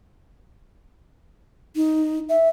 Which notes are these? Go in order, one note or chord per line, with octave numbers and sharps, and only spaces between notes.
D#4
E5